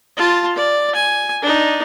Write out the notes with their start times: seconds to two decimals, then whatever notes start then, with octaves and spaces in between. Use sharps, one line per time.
0.17 F4 A5
0.56 D5
0.95 G#5
1.42 D4 D#4